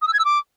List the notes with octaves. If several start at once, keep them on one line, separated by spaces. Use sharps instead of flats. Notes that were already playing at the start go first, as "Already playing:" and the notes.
D#6
E6
G#6
E6
D6